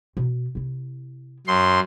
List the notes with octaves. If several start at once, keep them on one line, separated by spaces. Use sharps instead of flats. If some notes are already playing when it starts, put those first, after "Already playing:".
B2
C3 E4
F#2 C6